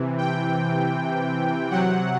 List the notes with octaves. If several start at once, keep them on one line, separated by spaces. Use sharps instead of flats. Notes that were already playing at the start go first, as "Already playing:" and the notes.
Already playing: C3 E3
G5
C3 F#3 F#5